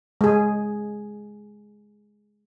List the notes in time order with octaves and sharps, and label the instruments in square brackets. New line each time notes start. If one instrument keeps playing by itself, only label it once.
[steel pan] G#3 G#4